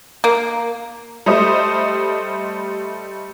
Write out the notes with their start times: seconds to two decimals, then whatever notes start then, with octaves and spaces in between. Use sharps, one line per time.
0.24 A#3
1.26 G3 A3 C5 D#5 D#6